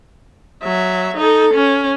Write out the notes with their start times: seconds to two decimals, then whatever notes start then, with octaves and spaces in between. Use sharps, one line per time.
0.63 F#3 E5
1.17 D#4 A4
1.54 C#4